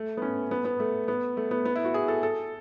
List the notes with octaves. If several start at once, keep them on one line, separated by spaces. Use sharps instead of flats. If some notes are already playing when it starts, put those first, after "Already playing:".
Already playing: A3
B3
C#4
B3
B3
A3
B3
A3
B3
B3
E4
F#4
G#4
A4
A4